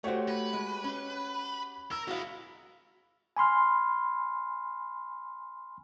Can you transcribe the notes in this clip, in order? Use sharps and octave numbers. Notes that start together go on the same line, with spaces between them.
A3 F#4 G4 C5 C#5
B4
G#3
C#4
A#4 E6
G#3 E4 F#4 F5
G#5 B5 C6 F6